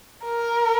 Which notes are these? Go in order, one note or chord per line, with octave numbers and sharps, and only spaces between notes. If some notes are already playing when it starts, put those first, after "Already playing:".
A#4